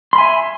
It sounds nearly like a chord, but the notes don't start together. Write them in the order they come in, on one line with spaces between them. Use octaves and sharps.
C6 B5 G#5 E5